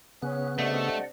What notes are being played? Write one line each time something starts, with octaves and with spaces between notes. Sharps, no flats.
C#3 B3 C#4 F#6
C3 A3 D4 D5 D#5 F#5